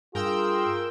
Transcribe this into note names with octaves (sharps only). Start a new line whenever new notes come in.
G2 F4 G#4 A#4 G5 E6